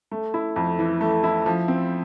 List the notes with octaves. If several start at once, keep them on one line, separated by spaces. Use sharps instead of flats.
A3
E4
F2
E3
A3
E4
F3
C4